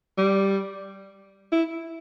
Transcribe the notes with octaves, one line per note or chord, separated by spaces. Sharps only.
G3
E4